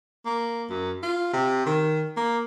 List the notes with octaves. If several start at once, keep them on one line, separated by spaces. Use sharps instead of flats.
A#3
F#2
F4
C3
D#3
A#3